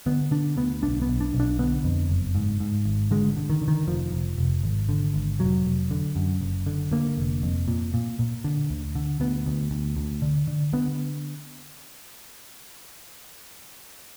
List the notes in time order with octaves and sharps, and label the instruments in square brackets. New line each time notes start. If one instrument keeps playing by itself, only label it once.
[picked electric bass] D3 B3
D3 D4
D2 B3
B1 D4
B3
B1
D4
B1
D4
D3 B3
F2
F#1
G#2
G#2
G#1
D3 G#3
D3
D#3
D3
D#3
F1 F3
F1
F1
G#1
D3
G#1
F1 F#3
F1
D3
F#2
F#1
D3
D3 A#3
F1
F2
A#2
A#2
A#2
D3
D2
D3
D2 B3
D2
D2
D2
D3
D3
D3 B3